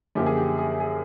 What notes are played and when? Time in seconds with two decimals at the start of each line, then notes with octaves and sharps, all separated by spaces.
0.15 F#2 D3 F3 A#3 G4
0.26 G#4
0.37 G4
0.58 G#4
0.80 G#4